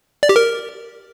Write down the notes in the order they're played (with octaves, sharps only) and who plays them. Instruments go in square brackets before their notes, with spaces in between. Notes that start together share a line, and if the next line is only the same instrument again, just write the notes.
[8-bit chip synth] D5
G4
A#4